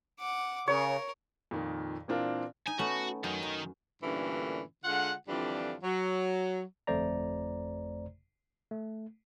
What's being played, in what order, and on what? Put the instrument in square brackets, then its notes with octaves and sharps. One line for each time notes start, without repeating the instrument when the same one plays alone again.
[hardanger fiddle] F#5 D6
[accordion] C#3 [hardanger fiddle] A#4 [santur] C#5
[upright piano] F2 A#2 D#3
A#2 E3 C4 D4 F4 A#4
[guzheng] D#4 [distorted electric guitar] G#5
[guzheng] A3 B3 C#4 [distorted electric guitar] F#4
[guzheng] F#2 [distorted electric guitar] D#3
[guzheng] F#2
[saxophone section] G2 A#2 D3 E3 A3 C#4
D3 G#3 F4 F#5
F2 D3 E3 G3 D4 F4
F#3
[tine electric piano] G1 F2 A3 C5 D5 A#5
A3